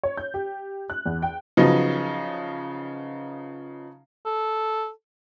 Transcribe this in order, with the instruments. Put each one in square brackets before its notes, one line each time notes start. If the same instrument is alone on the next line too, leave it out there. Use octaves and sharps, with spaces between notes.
[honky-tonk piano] C#5
G6
G4
F#6
E2
G5
[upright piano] C#3 F3 F#3 B3 D#4
[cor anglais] A4